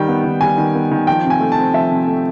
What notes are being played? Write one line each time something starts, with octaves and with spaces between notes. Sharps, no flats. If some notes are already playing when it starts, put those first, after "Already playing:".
Already playing: D#3 G3 G5
B3
D#3
G3 G#5
D#3
B3
D#3
F3 G5
C3
G#5
A3
A5
C4
F3 E5
C3
A3